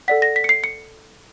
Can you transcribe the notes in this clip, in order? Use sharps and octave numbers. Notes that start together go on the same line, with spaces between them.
A4 D5 F#5 B6
A#6
B6
C#7
C7
C#7